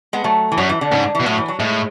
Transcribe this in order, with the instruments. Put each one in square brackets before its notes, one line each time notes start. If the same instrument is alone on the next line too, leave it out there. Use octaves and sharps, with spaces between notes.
[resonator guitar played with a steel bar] G#3 B3
F#3 A3
E3
[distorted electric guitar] F#2 [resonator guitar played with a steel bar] F#3
[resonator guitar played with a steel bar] E3
D3
[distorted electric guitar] G#2 [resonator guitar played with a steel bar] C#3
[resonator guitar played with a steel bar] D3
E3
[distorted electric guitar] B2
[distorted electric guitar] A2 [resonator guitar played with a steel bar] F#3
[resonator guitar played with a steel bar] E3
F#3
[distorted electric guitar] A2 [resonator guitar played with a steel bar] G#3